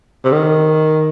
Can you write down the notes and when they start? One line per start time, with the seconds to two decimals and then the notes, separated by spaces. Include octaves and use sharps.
0.24 C3
0.32 D#3